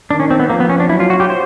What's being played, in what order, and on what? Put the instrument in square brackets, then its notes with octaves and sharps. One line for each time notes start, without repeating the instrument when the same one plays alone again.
[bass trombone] D#3 [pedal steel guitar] D4
[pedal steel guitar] C#4
C4
B3
[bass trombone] F3 [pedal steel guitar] A#3
[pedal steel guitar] B3
C#4
D4
[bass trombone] F#3 [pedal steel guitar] E4
[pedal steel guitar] F4
F#4
G4
C5